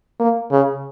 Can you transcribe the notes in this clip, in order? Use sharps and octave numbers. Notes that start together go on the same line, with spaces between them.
A#3
C#3